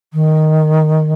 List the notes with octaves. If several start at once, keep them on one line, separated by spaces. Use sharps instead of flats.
D#3